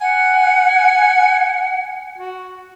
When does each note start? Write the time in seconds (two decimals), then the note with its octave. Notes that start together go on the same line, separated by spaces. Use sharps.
0.01 F#5 G#5
2.18 F#4